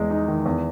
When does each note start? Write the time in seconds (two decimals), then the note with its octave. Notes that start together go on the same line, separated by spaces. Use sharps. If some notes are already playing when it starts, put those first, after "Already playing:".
Already playing: E2 G#3
0.10 D#4
0.28 D#3
0.46 E2